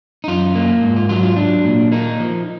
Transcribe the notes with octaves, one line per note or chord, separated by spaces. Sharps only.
D#4
F#2 F4
A#3
G#2
F4
F#3 F4
F4
F#3 D4
A#2
A#3 D#4
F3